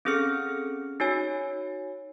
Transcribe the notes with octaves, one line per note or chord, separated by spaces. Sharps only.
C4 C#4 G#4 A4 F6 C#7
D#4 F#4 C#5 G#5